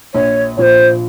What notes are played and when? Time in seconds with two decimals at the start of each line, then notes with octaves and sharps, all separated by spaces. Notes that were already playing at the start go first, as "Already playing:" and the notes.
0.14 A#1 C#5
0.57 A#2 F3 C5 C#5